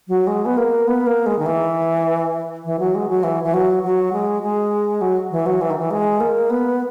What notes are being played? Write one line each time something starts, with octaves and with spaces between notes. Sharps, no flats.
F#3
G#3
B3
A#3
B3
A#3
G#3
D#3
E3
E3
F#3
G#3
F#3
E3
E3
F#3
F#3
G#3
G#3
F#3
E3
F#3
E3
D#3
E3
G#3
A#3
B3